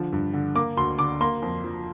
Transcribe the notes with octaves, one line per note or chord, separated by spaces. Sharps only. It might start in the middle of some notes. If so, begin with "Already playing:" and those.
Already playing: D3 F3
G2
D3
A#3 D6
D2 C6
D3 D6
A#3 C6
F2
F3